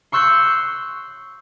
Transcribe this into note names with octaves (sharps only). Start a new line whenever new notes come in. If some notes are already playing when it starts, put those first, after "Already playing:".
C6 C#6 E6 F#6 G6 C7